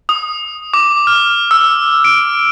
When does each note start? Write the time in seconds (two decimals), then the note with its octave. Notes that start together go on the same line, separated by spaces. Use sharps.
0.09 D#6
0.74 D6
1.07 F6
1.51 E6
2.04 D7